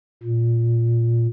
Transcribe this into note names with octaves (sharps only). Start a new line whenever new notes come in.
A#2